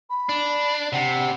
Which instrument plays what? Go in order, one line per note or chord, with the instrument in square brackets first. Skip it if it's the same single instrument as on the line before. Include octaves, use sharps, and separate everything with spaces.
[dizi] B5
[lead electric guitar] D4
[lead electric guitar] C3 [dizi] F#5